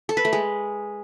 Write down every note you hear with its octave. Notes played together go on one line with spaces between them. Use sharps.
A4
B4
A3
G#3